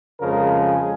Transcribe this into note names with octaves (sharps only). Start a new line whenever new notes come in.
F2 C#3 F3 G#3 A#4
G#4